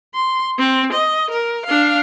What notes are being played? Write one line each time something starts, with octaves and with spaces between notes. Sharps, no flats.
C6
C4
D#5
A#4
D4 F5